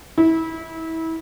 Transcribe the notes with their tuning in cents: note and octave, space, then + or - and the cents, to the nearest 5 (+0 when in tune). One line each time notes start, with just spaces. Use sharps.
E4 -25